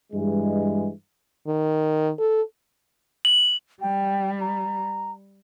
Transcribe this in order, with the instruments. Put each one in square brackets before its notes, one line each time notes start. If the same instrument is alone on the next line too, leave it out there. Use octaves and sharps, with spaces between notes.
[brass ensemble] G2 E3 G#3
[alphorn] D#3
A4
[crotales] F#7
[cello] G3 [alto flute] G5
[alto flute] A#5